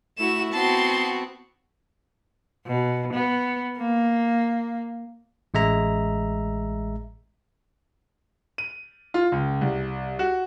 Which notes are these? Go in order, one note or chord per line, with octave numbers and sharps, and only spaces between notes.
A3 E4 F#4 E7
B3 C4 F#4 A5 C6
B2
B3
A#3
A1 G#3 E5 A#5
D#7
F4
C#2
C2
F#4